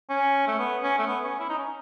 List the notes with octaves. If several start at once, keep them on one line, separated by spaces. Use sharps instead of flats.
C#4
A3
B3
C#4
A3
B3
C#4
E4
D#4
C#4